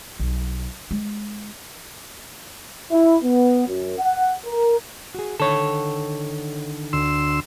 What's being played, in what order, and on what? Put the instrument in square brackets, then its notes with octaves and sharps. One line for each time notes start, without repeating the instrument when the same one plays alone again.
[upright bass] B1
G#3
[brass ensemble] E4
B3
F#2
F#5
A#4
[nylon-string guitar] F#4 G#4
[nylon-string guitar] D3 D#3 [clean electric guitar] A4 C#5
[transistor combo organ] D2 C6 E6